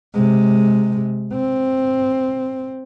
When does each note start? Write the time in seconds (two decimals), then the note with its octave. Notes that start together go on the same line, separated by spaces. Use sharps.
0.14 C3 G#3
1.32 C4